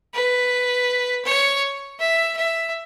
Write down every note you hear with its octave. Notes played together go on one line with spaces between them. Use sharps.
B4
C#5
E5
E5